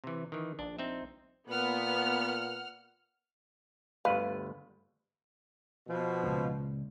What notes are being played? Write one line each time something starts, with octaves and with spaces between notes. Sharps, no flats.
C3 E3
D#3 E3
A#1 D4
C4 D#4 E5
A#2 B3 F#5 F6
G1 D2 B4 F5
B2 F3
C#2 A#2